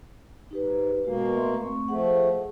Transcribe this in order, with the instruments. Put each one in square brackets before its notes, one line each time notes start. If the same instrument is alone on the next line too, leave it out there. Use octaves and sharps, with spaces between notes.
[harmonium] G#2 [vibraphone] D#4 G4 B4
[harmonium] B2 A#3 [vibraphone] G#3 F#4
[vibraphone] A3 E5 C6
A3 C4 C#6
[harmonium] F3 A3 [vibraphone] G#4 F#5